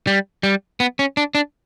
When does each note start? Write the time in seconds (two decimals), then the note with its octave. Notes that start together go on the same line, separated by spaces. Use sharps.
0.07 G3
0.43 G3
0.80 B3
0.99 C#4
1.17 D4
1.35 D4